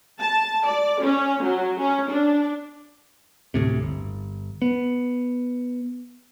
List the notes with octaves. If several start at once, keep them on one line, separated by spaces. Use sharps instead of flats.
A5
D5
C#4
F#3
C#4
D4
D2 A2 C3
G1
B3